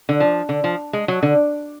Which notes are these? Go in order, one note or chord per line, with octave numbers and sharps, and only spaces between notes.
D3
F3
D3
F3
G#3
F#3
D3